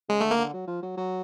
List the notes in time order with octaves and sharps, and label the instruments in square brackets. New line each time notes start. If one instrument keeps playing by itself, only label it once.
[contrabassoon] C#3 [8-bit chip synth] G#3
[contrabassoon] D3 [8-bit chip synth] A3
[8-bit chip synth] A#3
[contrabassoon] D3
F#3
F3
F#3
F#3